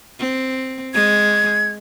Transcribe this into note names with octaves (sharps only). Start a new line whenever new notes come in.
C4
G#3 G#6